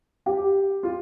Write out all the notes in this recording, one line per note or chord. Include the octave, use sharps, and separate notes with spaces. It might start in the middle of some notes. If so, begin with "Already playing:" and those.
G4
F4